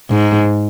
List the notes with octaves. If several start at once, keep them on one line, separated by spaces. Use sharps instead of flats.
G#2